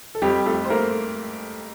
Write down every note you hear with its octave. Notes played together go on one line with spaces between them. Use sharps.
A4
F2 G3 G4
F2 A3 A4
C5
A3 A#3 A#4